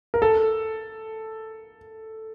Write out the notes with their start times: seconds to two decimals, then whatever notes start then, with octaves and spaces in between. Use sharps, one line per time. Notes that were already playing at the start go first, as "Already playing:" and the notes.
0.14 A#4
0.22 A4